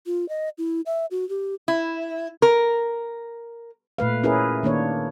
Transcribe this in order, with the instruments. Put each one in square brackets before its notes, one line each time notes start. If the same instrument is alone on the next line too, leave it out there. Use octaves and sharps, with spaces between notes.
[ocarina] F4
D#5
E4
E5
F#4
G4
[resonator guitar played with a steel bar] E4
A#4
[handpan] A#2 A3 B4 F5
C#4 E4 G#4 A#4 B4
D#3 A#3 D4 C#5